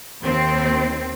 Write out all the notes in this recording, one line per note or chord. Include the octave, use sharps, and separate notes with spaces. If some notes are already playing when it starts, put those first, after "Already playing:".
D#2 C4